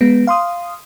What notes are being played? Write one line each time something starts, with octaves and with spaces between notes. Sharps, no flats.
G#3 B3
F5 C6 D#6